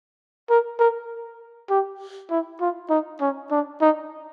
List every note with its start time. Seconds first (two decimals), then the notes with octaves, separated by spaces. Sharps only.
0.50 A#4
0.79 A#4
1.70 G4
2.30 E4
2.61 F4
2.90 D#4
3.21 C#4
3.51 D4
3.81 D#4